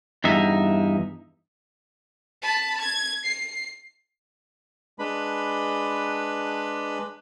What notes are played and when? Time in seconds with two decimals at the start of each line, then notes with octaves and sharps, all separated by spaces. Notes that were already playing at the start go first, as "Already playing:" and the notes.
0.24 E2 G2 D#4 E5
2.42 A5 B5
2.81 G#6
3.25 C7
4.99 G#3 D4 B4 B5